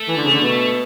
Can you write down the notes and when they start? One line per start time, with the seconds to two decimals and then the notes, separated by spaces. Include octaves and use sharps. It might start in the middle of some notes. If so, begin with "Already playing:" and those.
Already playing: A3
0.08 E3
0.17 D3
0.24 C#3
0.33 D3
0.41 B2